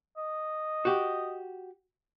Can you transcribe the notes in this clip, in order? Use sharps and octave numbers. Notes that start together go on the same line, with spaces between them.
D#5
F#4 G4